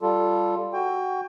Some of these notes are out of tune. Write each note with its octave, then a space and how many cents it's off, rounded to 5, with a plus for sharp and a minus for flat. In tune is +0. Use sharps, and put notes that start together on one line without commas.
G3 +0 F4 +0 A4 +0
F#4 +15 G5 +25